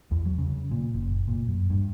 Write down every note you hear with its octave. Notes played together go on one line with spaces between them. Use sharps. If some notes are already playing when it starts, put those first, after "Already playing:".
E2
F#3
C#3
A#2
F#1
A#2
F#2
G2